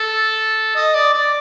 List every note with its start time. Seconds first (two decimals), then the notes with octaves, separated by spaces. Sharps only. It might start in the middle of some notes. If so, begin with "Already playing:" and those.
Already playing: A4
0.76 D#5
0.94 D5
1.14 D5